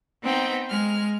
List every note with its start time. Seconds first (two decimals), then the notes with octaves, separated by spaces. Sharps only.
0.23 B3 C4 D#4 G5
0.70 G#3 F6